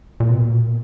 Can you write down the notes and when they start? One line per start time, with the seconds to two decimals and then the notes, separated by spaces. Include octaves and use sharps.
0.20 A#2
0.30 B2
0.40 A#2